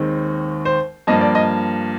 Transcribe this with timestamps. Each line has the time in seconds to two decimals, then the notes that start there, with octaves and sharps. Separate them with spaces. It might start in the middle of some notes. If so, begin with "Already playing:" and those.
Already playing: D#2 D#3 G#3 C4
0.65 C5
1.07 G2 F3 A#3 D#5
1.21 D5
1.35 D#5